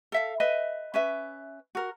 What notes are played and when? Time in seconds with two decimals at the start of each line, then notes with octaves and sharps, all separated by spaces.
0.12 A4 E5 F5
0.40 B4 D#5 E5
0.94 C#4 B4 E5
1.75 F#4 A#4